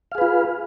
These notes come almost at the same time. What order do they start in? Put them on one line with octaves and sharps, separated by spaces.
F5 G#4 B4 F4